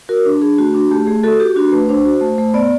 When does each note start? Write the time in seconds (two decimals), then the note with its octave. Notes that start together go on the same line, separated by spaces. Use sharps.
0.09 F#4 A#4
0.25 D4
0.42 D4 G#4
0.58 A3 F#4
0.74 D4 F#4
0.91 A3 G4
1.07 A3 G#4
1.23 F#4 A4
1.40 F#4 G4
1.56 D4 F#4
1.72 A3 B4
1.89 D4 C5
2.05 F#4
2.21 A3
2.38 A3
2.54 B3 D5